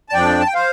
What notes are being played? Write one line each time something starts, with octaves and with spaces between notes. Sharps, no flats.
A5
F2 F3 D4 D5 G5
A5
G5
C5 F5